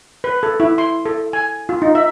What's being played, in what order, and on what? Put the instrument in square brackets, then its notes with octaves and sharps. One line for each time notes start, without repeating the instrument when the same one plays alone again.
[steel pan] B4
A4
E4
C6
A4
G#5
F4
D#4
E5